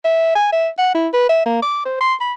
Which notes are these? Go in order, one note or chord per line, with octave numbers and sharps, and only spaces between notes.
E5
G#5
E5
F#5
E4
B4
E5
A#3
D6
C5
C6
B5